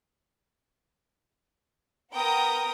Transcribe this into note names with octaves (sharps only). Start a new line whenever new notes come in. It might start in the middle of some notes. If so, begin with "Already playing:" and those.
B3 A#4 G5 D#6